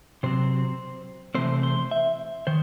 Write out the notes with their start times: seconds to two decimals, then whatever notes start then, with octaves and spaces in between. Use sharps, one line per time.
0.23 C3 F#3 C4 C5
1.35 C3 E3 A3 C4 C5
1.63 C5
1.91 E5
2.47 D#3 C5